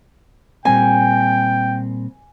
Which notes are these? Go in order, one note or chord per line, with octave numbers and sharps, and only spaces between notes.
A#2 G3 C4 G5 G#5